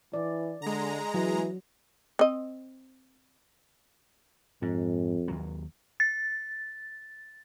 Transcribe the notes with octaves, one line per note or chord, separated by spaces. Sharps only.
E3 D5
D3 G#3 A#5
E3 F#3
C4 D#5
F2 G#2
D#2 F#3
A6